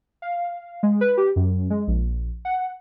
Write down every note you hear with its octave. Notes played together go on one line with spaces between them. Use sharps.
F5
G#3
B4
G4
F#2
G#3
A#1
F#5